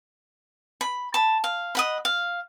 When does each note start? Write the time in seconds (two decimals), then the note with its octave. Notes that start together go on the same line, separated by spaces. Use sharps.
0.81 B5
1.14 A5 B5
1.44 F5
1.75 D#5 F#5 B5
2.05 F5